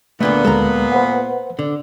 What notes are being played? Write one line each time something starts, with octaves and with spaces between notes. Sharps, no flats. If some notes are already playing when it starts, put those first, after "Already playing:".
D2 A#2 D3 A3 B3
D2 G#3 A4 A#5
B4 C5 F#5
D3